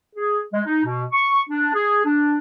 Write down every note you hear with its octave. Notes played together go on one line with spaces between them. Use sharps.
G#4
G#3
D#4
B2
C#6
D4
G#4
D4